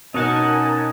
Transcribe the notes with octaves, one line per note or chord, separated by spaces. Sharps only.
B2 C#4 D#4 A#4 D#5 F#5 G#5 A5